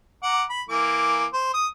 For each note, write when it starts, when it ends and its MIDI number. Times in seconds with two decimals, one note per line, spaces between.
0.23 0.43 78
0.23 0.43 82
0.23 0.43 86
0.50 0.62 83
0.69 1.25 52
0.69 1.25 58
0.69 1.25 86
1.33 1.54 72
1.54 1.66 87